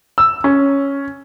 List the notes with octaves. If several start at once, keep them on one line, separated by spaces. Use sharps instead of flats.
E6
C#4